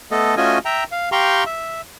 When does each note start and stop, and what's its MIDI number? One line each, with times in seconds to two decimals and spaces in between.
0.11 0.35 57
0.11 0.35 59
0.11 0.35 69
0.11 0.35 75
0.37 0.58 57
0.37 0.58 61
0.37 0.58 65
0.37 0.58 66
0.37 0.58 75
0.37 0.58 80
0.65 0.84 76
0.65 0.84 79
0.65 0.84 82
0.92 1.09 77
1.12 1.44 67
1.12 1.44 77
1.12 1.44 79
1.12 1.44 82
1.12 1.44 84
1.12 1.44 85
1.46 1.81 76